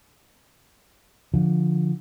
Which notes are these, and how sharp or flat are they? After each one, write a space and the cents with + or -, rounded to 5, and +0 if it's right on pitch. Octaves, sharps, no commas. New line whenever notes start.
D3 +0 F3 +0